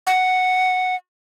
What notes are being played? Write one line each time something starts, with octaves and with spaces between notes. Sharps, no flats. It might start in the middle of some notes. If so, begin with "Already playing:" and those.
F#5